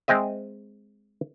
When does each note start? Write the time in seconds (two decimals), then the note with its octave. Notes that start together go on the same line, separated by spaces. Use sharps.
0.08 G#3 C4 D#5 E5